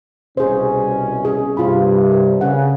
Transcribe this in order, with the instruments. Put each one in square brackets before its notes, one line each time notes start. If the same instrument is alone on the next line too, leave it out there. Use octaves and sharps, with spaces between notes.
[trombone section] C2 B2 C#4 [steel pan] G#4 C5
[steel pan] G#4
[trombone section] G2 C3 [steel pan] F4 B5
[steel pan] A#4
[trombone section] C#3 [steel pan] F#5